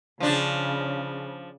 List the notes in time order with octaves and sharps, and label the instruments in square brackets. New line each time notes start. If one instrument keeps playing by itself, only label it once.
[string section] C#3 [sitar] F3 D4